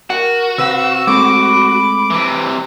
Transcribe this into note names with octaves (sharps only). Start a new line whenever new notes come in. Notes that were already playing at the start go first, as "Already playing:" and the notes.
F#4 A#4 F#5
C3 B4 F5 E6
G#3 A3 C4 B5 D6
C3 E3